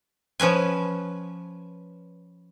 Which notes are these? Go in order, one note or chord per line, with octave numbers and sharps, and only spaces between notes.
F3 C#4 B4 G#5